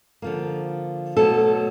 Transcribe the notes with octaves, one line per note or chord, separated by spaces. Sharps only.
D3 F3 A#3
B2 F#3 A3 A4